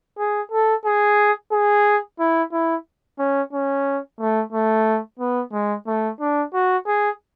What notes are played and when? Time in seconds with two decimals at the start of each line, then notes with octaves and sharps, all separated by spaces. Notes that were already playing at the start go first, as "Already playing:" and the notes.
0.18 G#4
0.51 A4
0.85 G#4
1.52 G#4
2.19 E4
2.52 E4
3.19 C#4
3.53 C#4
4.20 A3
4.53 A3
5.19 B3
5.52 G#3
5.87 A3
6.20 D4
6.54 F#4
6.87 G#4